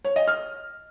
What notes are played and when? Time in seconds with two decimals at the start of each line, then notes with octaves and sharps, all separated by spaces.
0.04 C#5
0.16 D#5
0.28 F6